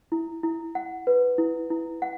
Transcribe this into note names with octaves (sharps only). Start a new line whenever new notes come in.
E4
E4
F#5
B4
E4
E4
F#5